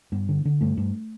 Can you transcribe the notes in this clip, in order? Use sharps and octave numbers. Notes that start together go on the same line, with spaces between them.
G2 B3
D3
D3
G2 A3
G2